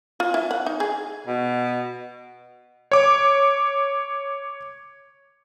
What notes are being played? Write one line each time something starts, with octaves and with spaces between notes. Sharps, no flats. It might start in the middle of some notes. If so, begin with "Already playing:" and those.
F4
E4
F#5
D#4
G#4
B2
C#5 D6